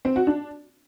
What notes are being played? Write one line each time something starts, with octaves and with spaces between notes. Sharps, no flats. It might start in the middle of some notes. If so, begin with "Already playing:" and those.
C4
F#4
D4